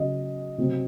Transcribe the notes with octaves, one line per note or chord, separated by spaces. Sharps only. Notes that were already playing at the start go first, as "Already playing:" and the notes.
Already playing: C#3 F#3 D#5
C3 F#3